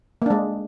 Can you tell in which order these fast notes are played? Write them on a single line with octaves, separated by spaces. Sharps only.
A#3 D4 G#3